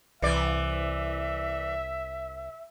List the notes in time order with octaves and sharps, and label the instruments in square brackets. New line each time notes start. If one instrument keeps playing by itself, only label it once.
[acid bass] C2 [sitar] E3 D5 [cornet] E5